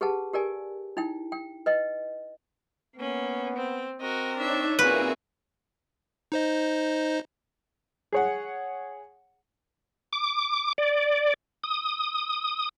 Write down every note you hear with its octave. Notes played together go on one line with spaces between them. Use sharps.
G4 G#4 B4 F#5 A5
G4 A#4 D5 G#5
D#4 E4 G5
G5
B4 D#5 G5
A#3 B3 C#4
C4
C4 F#4 A#4 D#5
D4 D#4 C#5 E5
A#2 C4 F#4 G#4 A#4 B4 E5
D#4 C5 D#5
G#4 C#5 F#5
D6
D5
D#6